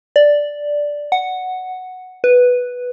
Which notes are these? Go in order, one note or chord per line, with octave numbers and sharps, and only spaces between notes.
D5
F#5
B4